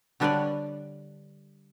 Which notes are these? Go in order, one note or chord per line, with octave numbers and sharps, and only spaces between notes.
D3 G3 D4 B4 C#5 D5